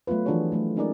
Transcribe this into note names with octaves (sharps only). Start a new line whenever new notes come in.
F#3 A3 B3 F4 B4
E3 F3 D4 F#4 G#4 C#5
F#3 A3
G#3 C#4 D#4 G#4 A#4 D5